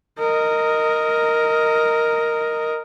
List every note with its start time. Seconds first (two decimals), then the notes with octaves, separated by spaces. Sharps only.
0.19 A#4 D#5